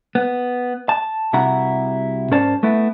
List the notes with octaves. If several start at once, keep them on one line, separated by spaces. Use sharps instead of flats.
B3
A5
C2 C3 E4 F#4 F#5 A#5
G#2 C#4 A#4 C5 D5 A5
A3 B3 E4